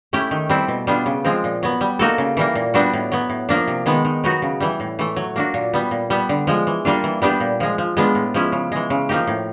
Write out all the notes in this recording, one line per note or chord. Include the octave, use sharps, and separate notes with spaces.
A3 C#4 E4 G4
D#3
G3 C4 E4
B2
G3 B3 D4 F4
C#3
F3 G#3 C4
A#2
F#3 B3
G3
A#3 D#4 F#4 A4
C#3
E3 G3 A#3
A#2
G3 B3 D4 F#4
A2
F#3 B3
A2
F3 A#3 D4
C3
D#3 G#3 B3
D#3
F#3 B3 D#4 F#4
C#3
E3 G3
A2
E3 A3
F#3
A#3 D4 F#4
A#2
G3 B3
A#2
G3 B3
D3
F3 G#3
E3
G3 A#3 D4 F4
E3
G3 B3 D4 G4
A#2
F3 G#3
F3
G#3 B3 D4 F4
A2
F3 G#3 C#4 E4
C#3
E3 G#3
C#3
F3 A#3 D#4 G4
A2